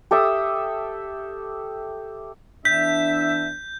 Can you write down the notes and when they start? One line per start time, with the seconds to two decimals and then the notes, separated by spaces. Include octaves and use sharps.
0.11 G4 A4 E5 D#6
2.65 E3 B3 D4 E5 G6 B6